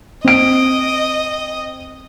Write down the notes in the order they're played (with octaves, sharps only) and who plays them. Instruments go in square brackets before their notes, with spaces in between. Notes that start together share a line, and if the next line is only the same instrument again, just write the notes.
[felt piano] C4 D7 [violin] D#5